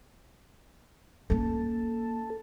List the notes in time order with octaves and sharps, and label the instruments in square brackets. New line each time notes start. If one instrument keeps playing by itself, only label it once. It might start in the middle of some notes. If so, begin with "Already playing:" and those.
[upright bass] A#3 C#4 [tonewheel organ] A4